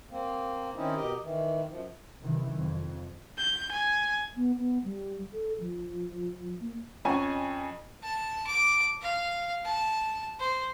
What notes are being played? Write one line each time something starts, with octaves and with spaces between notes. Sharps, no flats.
A#3 C4
D#3 C4 C#4 D#4 E4
B2 G4 A#4 D#5
D#3 E3
F#2 F3
C2 F#2 C3 D#3 E3
F2
G6
G#5
B3
B3
G3
A4
F3
A#3
F2 C#4 G#5 C#6
A5
D6
F5
A5
C5